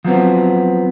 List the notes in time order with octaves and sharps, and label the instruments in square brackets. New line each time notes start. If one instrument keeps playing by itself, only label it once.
[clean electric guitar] F3 F#3 B3 C4